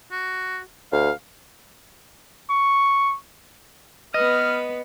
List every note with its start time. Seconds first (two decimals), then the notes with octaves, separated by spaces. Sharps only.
0.11 F#4
0.92 D2 F5
2.50 C#6
4.14 B3 B4 D#5 F6